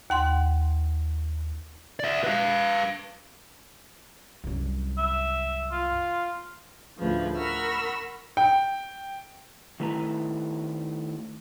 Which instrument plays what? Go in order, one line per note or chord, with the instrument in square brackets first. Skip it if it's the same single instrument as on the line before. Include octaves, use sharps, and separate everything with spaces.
[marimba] D#2 F#5 C6
[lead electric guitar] D5 E5
B4 F5
[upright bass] C2 F#2
[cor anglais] E5
F4
[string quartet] D2 A2 C#3 F3 B4
A#4 F#5 B5 C#6 E6 F6
[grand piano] G5
[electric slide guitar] D#3 A3 E4 B4 A#5